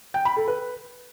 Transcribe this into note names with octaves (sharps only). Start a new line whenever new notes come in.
G5
B5
A4
B4